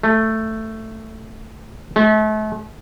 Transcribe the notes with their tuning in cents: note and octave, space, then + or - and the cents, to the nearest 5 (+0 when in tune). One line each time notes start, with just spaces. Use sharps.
A3 +5
A3 -40